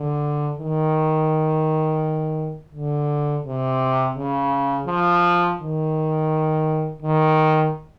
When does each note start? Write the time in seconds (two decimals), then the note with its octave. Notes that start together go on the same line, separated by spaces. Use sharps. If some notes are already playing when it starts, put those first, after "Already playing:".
Already playing: D3
0.59 D#3
2.72 D3
3.45 C3
4.15 C#3
4.87 F3
5.60 D#3
7.02 D#3